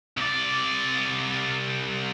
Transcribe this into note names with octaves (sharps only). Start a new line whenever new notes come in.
C2 D5